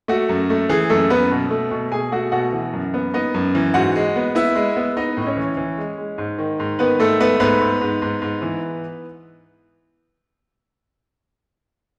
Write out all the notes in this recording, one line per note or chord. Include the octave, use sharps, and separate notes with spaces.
A3 F#4
F#2
A3
E3 G#4
F#2 A3 A4
F#2 B3 B4
B2
A3
B2
B2 G#4 G#5
A3 F#4 F#5
B2 F#4 F#5
E3
F#2
B3
B3 D#4 D#5
F#2
E3
G#2 F#4 F#5
G#3
B3
B3 E4 E5
G#3
B3
B3 D#4 D#5
A2
D#5
C#4 C#5
E3
E3
G#3
G#3
G#2
D#3
G#2
D#3 B3 B4
G#2 A3 A4
A3 B3 B4
G#2 B3 B4
G#2
G#2
G#2
G#2
E3